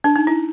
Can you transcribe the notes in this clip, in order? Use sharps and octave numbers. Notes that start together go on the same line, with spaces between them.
D4
D#4
E4